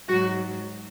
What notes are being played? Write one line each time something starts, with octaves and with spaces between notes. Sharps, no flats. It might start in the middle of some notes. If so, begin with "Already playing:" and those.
G#2 F#3 F#4